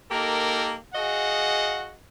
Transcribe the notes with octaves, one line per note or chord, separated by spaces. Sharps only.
A#3 D#4 G4 A4 A#4
F#4 G#4 D#5 F5 F#5